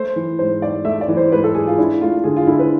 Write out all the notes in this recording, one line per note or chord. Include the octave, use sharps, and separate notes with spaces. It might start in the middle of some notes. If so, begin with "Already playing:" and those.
Already playing: A3 C5
E3
G#2 C5
G#2 D5
A3 E5
D5
E3
C5
G#2 B4
A4
G#2 G#4
F4
D4 E4
A3 F4
D3 G#4
F4
D3 E4
B4